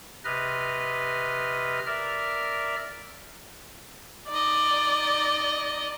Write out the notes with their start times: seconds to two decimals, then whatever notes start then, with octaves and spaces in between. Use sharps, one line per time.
0.24 C3 B4 D#5 F6
1.86 A#4 D5 E5 F6
4.29 D#4 D5 D#5